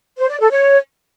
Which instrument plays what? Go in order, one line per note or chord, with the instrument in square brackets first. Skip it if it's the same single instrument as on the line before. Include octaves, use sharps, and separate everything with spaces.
[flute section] C5
D5
A4
C#5